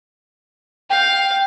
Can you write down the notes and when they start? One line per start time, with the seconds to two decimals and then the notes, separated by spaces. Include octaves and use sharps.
0.90 F5 G5